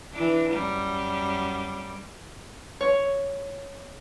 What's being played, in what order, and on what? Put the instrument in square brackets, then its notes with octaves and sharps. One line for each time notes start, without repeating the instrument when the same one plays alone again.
[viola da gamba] E3 D4
F#2 G3
[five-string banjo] C#5